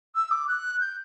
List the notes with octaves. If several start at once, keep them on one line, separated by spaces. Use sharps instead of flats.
E6
D6
F#6
G6